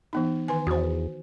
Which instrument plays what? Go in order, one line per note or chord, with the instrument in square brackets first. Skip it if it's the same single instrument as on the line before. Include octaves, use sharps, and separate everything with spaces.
[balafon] E3 B3 D#4
D#3 B4 G#5
[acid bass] E2 [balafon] F#4 C5